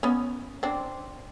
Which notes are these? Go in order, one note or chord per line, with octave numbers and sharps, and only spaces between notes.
B3 C#4
C4 D4